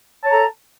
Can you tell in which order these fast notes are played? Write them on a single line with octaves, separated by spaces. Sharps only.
A5 C#5 A#5 A4